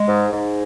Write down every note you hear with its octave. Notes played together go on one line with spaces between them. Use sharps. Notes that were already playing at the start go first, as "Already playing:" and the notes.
Already playing: G#3
G#2
G#2